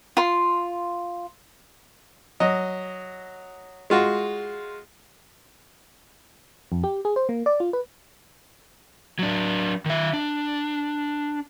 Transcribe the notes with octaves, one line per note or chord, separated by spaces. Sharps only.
F4 C6
F#3 D#5
G#3 F4 F#4
F2
G4
G#4
C5
A#3
D5
F4
B4
F#3 D4
D#3 E5
D4